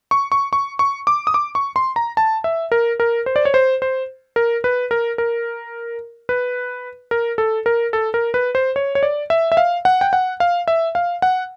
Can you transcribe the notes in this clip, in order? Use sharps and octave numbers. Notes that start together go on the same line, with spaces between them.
C#6
C#6
C#6
C#6
D6
D#6
D6
C#6
C6
A#5
A5
E5
A#4
A#4
C5
D5
C#5
C5
C5
A#4
B4
A#4
A#4
B4
A#4
A4
A#4
A4
A#4
B4
C5
C#5
C#5
D5
E5
E5
F5
F#5
G5
F#5
F5
E5
F5
F#5